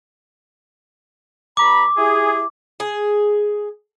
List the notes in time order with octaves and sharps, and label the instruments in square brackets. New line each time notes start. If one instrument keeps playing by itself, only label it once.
[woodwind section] G2 A#5 B5 [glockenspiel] D6
[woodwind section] E4 G4 G#4
[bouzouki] G#4